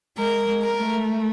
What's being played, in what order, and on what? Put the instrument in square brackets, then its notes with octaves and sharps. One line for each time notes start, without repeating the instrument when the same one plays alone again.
[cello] G#3 [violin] A#4
[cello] G#3
[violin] A#4
[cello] A3